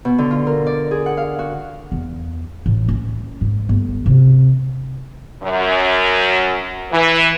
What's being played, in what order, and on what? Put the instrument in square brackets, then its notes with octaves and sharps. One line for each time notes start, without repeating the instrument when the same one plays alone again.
[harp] B2
D3
F4
A#4
D5
G#4
F#5
F5
F#4
[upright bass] E2
A1
C#4
G#2
G1
C3
[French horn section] F#2
E3